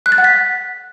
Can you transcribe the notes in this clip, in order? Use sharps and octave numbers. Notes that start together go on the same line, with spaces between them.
F#6
A6
F#5
B6